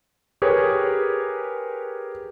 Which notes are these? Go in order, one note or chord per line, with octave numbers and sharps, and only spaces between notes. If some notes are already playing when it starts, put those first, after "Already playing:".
G4 G#4 A#4 B4 C#5